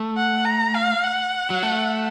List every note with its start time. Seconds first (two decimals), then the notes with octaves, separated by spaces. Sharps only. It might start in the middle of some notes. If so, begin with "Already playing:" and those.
Already playing: A3
0.17 F#5
0.45 A#5
0.75 F5
1.03 F#5
1.50 F#3
1.63 A3